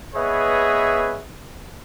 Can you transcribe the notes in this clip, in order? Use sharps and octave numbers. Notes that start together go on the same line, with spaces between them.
B3 G#4 B4 C#5 D#5 E5